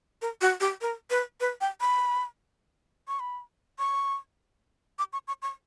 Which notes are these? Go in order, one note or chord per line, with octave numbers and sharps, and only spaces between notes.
A#4
F#4
G4
A#4
B4
B4
G5
B5
C#6
B5
C#6
D6
C#6
C#6
C#6